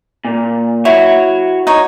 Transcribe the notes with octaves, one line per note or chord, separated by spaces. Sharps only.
A#2
E4 F#4 C#5
D#4 C#5